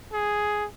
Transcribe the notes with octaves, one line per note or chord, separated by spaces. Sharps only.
G#4